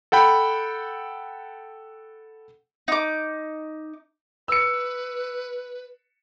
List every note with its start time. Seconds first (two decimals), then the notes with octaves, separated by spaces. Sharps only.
0.12 A4 F#5 G5 B5
2.88 D#4 D6
4.48 B4 E6 C#7